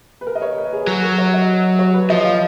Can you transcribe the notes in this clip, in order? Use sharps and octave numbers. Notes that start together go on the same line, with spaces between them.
B4
A#4
D#5
C#5
B4
G#4
F#3 F#4
A#4
C#5
D#5
C#5
B4
F3 D#5
F5